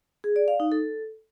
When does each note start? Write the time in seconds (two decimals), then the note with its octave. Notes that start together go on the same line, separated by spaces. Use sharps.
0.24 G#4
0.36 D5
0.48 F5
0.60 D#4
0.72 A4